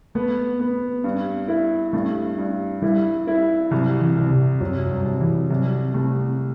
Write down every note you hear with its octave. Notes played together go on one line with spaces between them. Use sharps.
A3 B3
B3
G2
E4
G2 A3
G2
G3 E4
E4
C2 F#3
E3
C2
C3
F#2 F#3
G2
C2
E3
C2 F#3
C2 A3